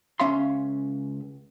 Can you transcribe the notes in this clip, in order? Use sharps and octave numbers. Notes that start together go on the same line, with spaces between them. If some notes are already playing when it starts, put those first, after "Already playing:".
C#2 C#4 E5 F5 C6